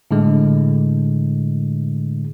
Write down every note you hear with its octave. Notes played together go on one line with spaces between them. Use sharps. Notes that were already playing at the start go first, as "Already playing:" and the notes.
A2 D3 G#3